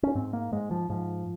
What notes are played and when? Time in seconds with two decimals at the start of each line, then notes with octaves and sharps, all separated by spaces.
0.03 C#4
0.15 G#2 C4
0.33 A#3
0.52 G#2 G#3
0.71 F3
0.90 G#2 F3